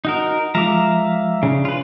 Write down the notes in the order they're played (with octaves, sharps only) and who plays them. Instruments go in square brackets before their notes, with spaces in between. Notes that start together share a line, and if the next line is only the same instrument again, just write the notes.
[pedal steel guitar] D#4 F#4 A#4
[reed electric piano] F3 G#3 D6 [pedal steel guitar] E5 F5 A#5
[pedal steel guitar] C#3 [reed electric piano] C#4 D4
[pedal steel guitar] F4 B4